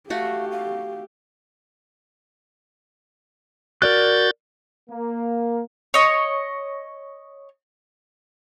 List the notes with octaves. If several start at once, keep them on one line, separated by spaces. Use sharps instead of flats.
A3 F#4 G4 F5
F5
F#4 A#4 D5 F#6 G6 A6
A#3
C#5 D#5